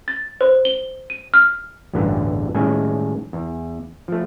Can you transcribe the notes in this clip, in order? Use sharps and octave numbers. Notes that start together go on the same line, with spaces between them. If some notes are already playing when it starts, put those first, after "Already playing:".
A6
C5
G7
D#7
F6
A1 E2 G2 D3 G3 B3
A2 D#3 G3 G#3 C#4 E5
E2
F3 A3